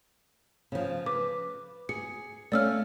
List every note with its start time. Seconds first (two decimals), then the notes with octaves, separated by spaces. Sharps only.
0.72 C#3 F3
1.06 B4 D6
1.89 G#4 C#7
2.52 A3 C#4 D5 F5 E6 F6